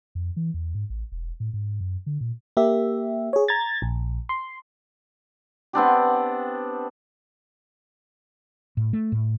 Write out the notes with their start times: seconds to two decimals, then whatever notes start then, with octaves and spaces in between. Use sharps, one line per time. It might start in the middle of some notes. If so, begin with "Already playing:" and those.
0.15 F2
0.36 E3
0.54 E2
0.75 G#2
0.90 A1
1.12 E1
1.40 A2
1.53 G#2
1.81 F#2
2.06 D3
2.21 A#2
2.57 A#3 G4 E5
3.33 G#4 C#5
3.48 A#5 G#6 A6
3.82 A#1
4.29 C6
5.73 B3 C4 D4 G4
8.77 A2
8.93 A3
9.12 A2